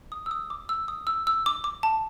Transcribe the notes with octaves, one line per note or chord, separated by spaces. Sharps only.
D#6
E6
D#6
D6
E6
D#6
E6
E6
D6
D6
A5